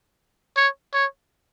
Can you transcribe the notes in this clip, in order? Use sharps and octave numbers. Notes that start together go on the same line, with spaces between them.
C#5
C#5